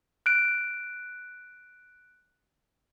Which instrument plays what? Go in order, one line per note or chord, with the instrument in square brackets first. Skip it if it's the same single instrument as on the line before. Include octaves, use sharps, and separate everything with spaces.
[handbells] F#6 D7